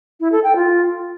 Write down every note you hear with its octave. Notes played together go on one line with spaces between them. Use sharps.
E4
A4
G5
F4